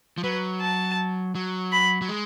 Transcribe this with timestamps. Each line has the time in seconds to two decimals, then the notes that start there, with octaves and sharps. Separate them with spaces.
0.18 F3
0.23 F#3 B4
0.61 A5
1.35 F#3
1.72 B5
2.02 F#3
2.09 G#3